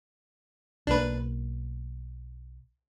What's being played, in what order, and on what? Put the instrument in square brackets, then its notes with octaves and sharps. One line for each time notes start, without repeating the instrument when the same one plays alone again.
[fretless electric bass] B1 A#3 [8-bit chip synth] D4 B4